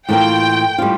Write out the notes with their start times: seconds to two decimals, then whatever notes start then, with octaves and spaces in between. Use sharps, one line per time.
0.08 A2 E3 A#3 F4 G5
0.78 A2 G3 D4 F4